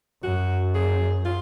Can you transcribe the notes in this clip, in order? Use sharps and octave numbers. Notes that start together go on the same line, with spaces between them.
F#2 F#4
G#4
F4